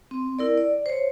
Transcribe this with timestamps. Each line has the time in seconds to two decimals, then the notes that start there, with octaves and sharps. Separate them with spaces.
0.11 C4
0.39 E4 A#4 D5
0.58 D5
0.86 C5 C#5